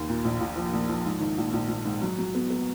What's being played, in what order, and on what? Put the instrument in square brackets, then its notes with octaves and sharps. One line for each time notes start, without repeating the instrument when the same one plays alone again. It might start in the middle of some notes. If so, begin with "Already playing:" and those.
Already playing: [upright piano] D#2
A#2
A#1
A#1
F3
A#1
F3
G#2
D#3
A#1
A#1
A#1
G#2
F#3
F#3
B3
B3